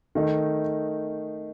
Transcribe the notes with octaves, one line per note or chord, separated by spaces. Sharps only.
D#3 A3 D#4